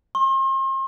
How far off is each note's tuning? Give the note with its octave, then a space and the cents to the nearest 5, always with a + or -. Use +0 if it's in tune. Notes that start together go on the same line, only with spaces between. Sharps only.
C6 +40